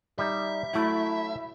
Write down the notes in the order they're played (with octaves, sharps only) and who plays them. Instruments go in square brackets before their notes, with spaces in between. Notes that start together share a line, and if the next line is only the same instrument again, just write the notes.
[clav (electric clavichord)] G3 D#4 [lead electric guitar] E5
[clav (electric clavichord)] F#3 A3 [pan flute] E4